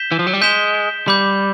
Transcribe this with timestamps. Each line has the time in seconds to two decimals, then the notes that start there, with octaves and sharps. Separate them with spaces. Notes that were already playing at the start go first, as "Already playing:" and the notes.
Already playing: G6 B6 E7 G7
0.12 E3
0.19 F3
0.27 F#3
0.33 G3
0.41 G#3 G6 B6 E7 G7
1.08 G3 B5 D6 G6